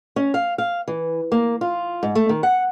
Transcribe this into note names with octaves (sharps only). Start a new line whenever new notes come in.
C#4
F5
F5
E3
A#3
F4
G#2
A3
D#3
F#5